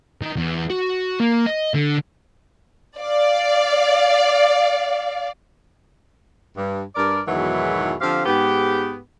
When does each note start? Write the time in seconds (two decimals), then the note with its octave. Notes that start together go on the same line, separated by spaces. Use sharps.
0.22 D#3
0.37 E2
0.70 F#4
1.20 A#3
1.47 D#5
1.75 D3
2.98 D5 F5
6.57 G2
6.96 G2 A#4 D5
7.27 E2 G#2 B2 D#3 E3 F#3
8.01 D3 F3 C4 G4 F5
8.26 G#2 B3 G4